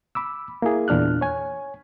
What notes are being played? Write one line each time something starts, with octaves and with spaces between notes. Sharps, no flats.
B5 D6 E6
A#3 E4 G#4
E2 A#2 D4 F6 F#6
C#5 G#5